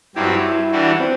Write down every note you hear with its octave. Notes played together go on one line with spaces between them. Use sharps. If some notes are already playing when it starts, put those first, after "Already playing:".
G2 F#3 C4 E4 G4
F#4
E4
E3 G3 D4 F#4
C4